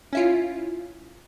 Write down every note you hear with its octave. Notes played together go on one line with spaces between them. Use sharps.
C#4 E4 F4